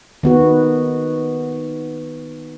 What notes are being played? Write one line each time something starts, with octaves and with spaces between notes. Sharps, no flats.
D#3 B3 F#4